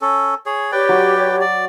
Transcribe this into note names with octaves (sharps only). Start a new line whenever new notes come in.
C#4 A4
G#4 C#5
G4 B4 C#5 D5 G5 D6
F#3
D5